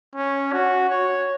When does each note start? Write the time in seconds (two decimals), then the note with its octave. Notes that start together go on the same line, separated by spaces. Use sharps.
0.15 C#4
0.53 F#4
0.90 C#5